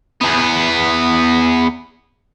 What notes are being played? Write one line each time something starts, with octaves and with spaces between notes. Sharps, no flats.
E2 B3